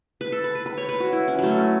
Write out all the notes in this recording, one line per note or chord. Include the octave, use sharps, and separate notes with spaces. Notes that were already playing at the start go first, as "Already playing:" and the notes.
B4
A4
B4
B4
B4
C#5
B4
F#4
E4
C#4
F#3 A3
C#4